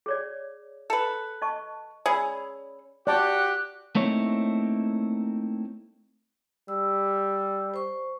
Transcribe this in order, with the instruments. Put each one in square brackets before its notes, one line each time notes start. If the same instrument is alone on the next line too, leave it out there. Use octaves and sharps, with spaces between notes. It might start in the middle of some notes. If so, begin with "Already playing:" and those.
[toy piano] G#4 C#5 D5
[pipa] A4 B4
[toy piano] D#5 A5 C#6
[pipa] C#4 G#4 [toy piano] D5 B5 E6
[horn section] F#4 G4 [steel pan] D5 A5 [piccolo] F#6
[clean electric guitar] A3 A#3 C4 D#4 E4 C#5
[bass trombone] G3 [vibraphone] E6
[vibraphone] C5 C#6